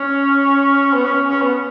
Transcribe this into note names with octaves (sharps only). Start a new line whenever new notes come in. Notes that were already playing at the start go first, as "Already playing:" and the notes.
Already playing: C#4
B3
C#4
C#4
B3